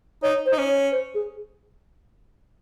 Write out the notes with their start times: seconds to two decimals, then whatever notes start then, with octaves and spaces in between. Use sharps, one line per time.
0.23 D#4 C#5
0.46 C5
0.52 D#4
0.58 C#4
0.69 C#5
0.92 C5
1.15 G#4